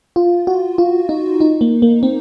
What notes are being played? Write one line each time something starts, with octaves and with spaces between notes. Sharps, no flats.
F4
F#4
F4
D#4
D#4
A#3
A#3
C4